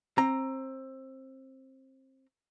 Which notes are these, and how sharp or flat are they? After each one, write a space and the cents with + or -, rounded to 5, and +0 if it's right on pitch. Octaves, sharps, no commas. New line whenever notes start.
C4 +20 A#5 +0